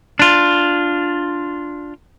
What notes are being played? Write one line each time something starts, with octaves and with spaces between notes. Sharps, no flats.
D4 F4